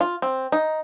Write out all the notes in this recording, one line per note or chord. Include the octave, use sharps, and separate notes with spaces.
F4
C4
D#4